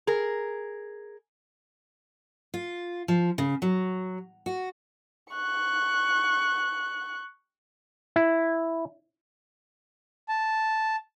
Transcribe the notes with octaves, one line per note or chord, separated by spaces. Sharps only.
G#4 A#4
F4
F3
C#3
F#3
F#4
C#6 F#6
E4
A5